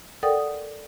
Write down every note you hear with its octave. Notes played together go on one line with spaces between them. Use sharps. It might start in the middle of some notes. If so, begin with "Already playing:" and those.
A4 A#4 D5 F#5 G5 D#6